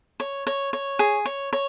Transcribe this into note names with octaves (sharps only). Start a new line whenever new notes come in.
C#5
C#5
C#5
G#4
C#5
C#5